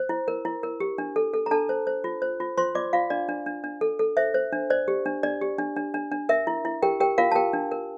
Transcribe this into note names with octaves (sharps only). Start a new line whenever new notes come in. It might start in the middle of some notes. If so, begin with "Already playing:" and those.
Already playing: C5
E4
A#4
E4
A#4
G4
D4
A4
A4
A#5
D4 A4 A5
C5
C5
F4
C5
F4
F4 C5 C6
F4 D5 D6
F4 F5
D4 D5
D4
D4
D4
A4
A4
C5 E5
C5
D4
C5 D5
G4
D4
D4 D5
G4
D4
D4
D4
D4
A#4 E5
E4
E4
G4 A#4 G5
G4 A#4 G5
F4 A#4 F5
A5
G4 A#4 G5
D4
A#4